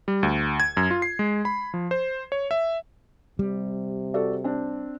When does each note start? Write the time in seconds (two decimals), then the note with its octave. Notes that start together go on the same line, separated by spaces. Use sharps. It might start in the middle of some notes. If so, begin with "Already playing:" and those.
0.08 G3
0.23 D2
0.60 G#6
0.77 F#2
0.91 F4
1.02 C7
1.19 G#3
1.45 B5
1.74 F3
1.91 C5
2.32 C#5
2.51 E5
3.39 C3 G3
4.14 F#4 A4 D5
4.44 C4 D4